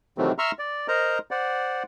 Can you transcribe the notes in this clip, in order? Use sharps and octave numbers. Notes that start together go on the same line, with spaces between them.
C3 D#3 E3 F#3 A3 C4
E5 A#5 C6 C#6 E6 F6
D5
A#4 C5 D#5 A#5
C5 D5 F#5